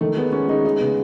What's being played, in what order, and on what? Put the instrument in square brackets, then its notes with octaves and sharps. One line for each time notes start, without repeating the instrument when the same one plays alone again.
[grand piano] D#3 [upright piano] A3
[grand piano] G#3 [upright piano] B3
[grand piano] G#3 [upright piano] C#4
[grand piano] G#3 [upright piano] D#4
[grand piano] G#3 [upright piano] D#4
[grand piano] C#3 [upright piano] B3